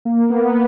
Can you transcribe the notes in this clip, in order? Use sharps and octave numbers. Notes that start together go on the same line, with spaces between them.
A#3
B3